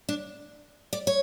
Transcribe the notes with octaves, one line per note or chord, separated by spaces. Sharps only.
D4
D5
C#5